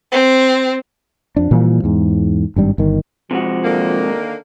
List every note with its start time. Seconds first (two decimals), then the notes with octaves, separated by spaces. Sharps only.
0.12 C4
1.36 F2 F3 D4
1.51 A#2 E3 F3 G3
1.84 E2 G#2
2.56 G#1 G2 G3
2.78 G1 D#3
3.31 C3 F3 G#3 F#4
3.64 D3 D#3 A#3